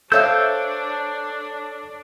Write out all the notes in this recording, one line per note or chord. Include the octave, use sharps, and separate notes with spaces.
D4 A4 C5 C#5 E5 F5 E6 G6